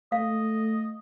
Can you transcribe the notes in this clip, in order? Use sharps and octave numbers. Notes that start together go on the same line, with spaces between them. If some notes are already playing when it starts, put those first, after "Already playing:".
A3 D#5 F5